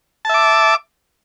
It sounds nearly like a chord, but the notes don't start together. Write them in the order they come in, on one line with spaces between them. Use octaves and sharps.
A5 E5 D6